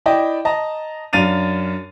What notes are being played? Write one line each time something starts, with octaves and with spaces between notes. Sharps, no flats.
E4 D5 D#5 G5
D#5 A5 A#5
F#2 D4 F5 A6 D#7 F7